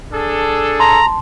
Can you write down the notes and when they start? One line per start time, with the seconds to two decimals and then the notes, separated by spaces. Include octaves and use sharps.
0.12 D4 G#4 A4
0.80 A5 A#5 C6